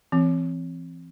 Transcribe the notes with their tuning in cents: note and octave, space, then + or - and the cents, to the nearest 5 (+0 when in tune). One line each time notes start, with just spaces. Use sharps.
E3 +25 C4 +0